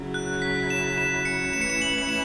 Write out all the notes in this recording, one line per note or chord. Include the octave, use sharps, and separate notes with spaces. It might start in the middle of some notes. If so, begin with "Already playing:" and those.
Already playing: C#3 F#3 C#4 E4
F#6
B6
E7
E7
C#7
A2 E3 C#4 E4 E7
C#7
E7
F#7
C#7
E7